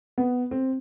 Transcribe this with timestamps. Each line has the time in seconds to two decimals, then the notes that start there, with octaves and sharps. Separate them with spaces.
0.18 B3
0.51 C4